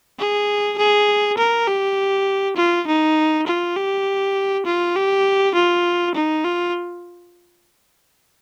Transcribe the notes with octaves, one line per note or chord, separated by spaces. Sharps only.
G#4
G#4
A#4
G4
F4
D#4
F4
G4
F4
G4
F4
D#4
F4